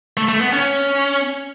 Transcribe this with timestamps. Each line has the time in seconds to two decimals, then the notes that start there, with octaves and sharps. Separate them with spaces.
0.17 A3
0.28 A3
0.41 B3
0.53 C#4